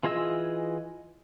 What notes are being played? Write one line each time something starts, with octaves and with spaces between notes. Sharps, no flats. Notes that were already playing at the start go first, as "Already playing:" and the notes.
E3 F4 G#4 D#5 E6